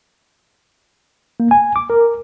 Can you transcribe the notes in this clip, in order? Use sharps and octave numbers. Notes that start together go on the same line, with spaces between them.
A#3
G#5
D6
A#4